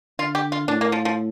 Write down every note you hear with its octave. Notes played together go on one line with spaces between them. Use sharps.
D3 F4
G4
F4
A2 D4
A#3
F3
F3